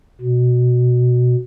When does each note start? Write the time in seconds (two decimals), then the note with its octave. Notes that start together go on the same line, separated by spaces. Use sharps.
0.21 B2